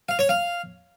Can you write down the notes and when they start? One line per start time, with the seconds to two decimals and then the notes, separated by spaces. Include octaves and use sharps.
0.09 F5
0.19 C#5
0.29 F5